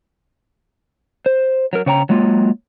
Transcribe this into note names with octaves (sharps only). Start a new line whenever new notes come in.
C5
F#3 A#4
C#3 C#5 G5 A#5
F#3 G#3 A#3 F4